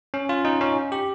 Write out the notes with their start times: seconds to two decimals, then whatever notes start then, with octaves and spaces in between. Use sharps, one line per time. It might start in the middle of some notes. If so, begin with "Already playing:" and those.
0.14 C#4
0.29 F4
0.45 D#4
0.61 C#4
0.92 G4